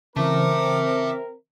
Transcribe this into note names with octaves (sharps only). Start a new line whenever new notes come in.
C#3 E3 C4 A#4 E5 A5 D6